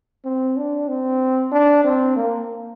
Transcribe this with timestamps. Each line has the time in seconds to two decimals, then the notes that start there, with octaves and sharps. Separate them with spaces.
0.25 C4
0.57 D4
0.88 C4
1.52 D4
1.84 C4
2.16 A#3